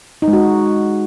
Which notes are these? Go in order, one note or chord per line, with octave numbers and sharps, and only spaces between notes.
D#4
G#3
F#4